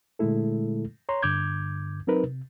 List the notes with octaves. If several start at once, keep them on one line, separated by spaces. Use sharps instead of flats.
A#2 D3 G#3 A3 E4 A4
C#5 A#5 C6
G2 D3 D6 G6 G#6
F#3 C4 D#4 A#4 B4
C3